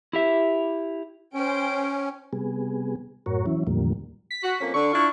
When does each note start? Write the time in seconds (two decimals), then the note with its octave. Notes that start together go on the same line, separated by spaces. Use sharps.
0.13 E4 G4 E5
1.34 C#4 C5 G5 D7
2.33 C3 G3 B3 G#4
3.26 F#2 A2 F#4 A#4 C#5
3.46 E3 F#3 C#4 E4
3.67 E2 A2 D3 F3 G3 A#3
4.31 B6
4.42 F#4
4.60 F2 A#3 C#4
4.74 D3 C#6
4.92 D4 E4 F4